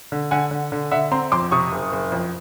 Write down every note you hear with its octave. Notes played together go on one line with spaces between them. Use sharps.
D3
D3 F#5 G#5
D3
D3
D3 E5 F#5
C4 A#5 C6
F2 C6 D6
C3 C#6 D#6
F#1
F#1
F2